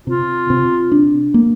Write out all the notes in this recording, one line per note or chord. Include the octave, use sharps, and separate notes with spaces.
C3 F4
C3
D4
A#3